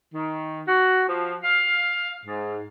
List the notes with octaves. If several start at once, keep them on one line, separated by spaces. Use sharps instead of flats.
D#3
F#4
F3
F5
G#2